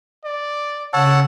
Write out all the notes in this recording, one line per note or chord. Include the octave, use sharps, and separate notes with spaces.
D5
C#3 C#5 F#5 A5 E6